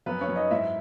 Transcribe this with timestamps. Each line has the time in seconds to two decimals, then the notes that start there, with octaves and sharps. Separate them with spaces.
0.06 F#2 B3 B4
0.21 C#4 C#5
0.28 F#2
0.36 D#4 D#5
0.51 G#2 E4 E5